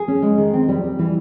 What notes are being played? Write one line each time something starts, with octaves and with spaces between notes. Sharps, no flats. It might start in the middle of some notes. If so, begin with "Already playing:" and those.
Already playing: G#4
C#4
G#3
D#3
C4
G3
G3
E3